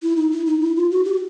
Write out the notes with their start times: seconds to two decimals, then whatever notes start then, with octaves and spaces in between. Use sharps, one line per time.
0.03 E4
0.17 D#4
0.31 E4
0.46 D#4
0.62 E4
0.76 F4
0.91 F#4
1.05 G4